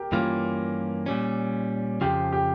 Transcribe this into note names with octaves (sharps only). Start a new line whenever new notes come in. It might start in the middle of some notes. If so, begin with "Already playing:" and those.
Already playing: G4 A#4
G2 E3 A#3 C#4 F4
A#2 G3 C#4
F2 C#3 F3 G4
G4